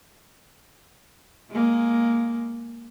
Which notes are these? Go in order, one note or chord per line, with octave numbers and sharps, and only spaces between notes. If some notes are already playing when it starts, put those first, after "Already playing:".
G#3 A#3